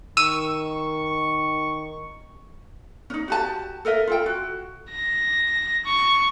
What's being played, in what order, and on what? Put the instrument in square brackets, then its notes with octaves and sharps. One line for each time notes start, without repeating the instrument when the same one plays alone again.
[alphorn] D#3 [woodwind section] C#6 [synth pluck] E6 D#7
[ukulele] C#4 D#4
F#4 G4 A5
A4 A#4 D#5 E5
F4 A4 G5
F#4
[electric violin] A#6
C#6